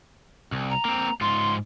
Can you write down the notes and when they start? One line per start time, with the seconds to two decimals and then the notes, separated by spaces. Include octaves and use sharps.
0.52 C2
0.70 A#5
0.85 A#3 C4
1.21 G#2 F4 C6